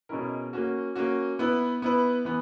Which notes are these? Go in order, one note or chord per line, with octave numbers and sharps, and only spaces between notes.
B2 G#3 C#4 E4 A#4
A#3 C#4 F#4
A#3 C#4 F#4
B3 E4 B4
B3 E4 B4
E3 B3